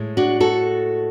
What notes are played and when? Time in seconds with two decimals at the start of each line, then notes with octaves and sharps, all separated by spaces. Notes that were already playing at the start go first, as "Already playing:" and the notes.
Already playing: A2 G#3
0.17 D4 F#4
0.40 F#4 A4